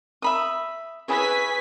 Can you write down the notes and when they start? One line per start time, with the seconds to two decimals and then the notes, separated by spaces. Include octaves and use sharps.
0.22 E5 B5 D#6
1.08 E4 G#4 B4 C#5 G#5 B6